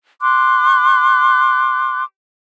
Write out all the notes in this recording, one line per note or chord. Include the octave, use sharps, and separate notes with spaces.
C6 D6 F#6